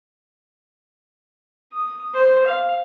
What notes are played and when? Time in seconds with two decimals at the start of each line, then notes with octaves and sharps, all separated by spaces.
1.73 D#6
2.14 C5
2.46 F5